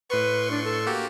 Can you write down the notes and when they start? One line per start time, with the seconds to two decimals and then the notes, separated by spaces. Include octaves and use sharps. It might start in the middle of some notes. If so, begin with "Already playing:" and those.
0.10 A2 B4 C6 C#6
0.51 D4
0.64 A4
0.87 A#3 F#4 G4